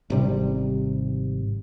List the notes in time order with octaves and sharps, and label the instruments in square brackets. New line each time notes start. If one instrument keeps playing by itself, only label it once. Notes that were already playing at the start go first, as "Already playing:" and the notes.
[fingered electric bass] G#1 C3 G3